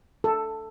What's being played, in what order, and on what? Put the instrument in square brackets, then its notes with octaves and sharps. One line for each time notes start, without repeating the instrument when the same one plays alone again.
[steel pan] A4